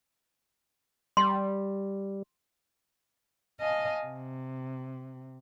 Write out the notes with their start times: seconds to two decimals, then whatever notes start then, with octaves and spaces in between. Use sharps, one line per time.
1.17 G3 C6
3.60 D#5 F5 G#5 A5
4.03 C3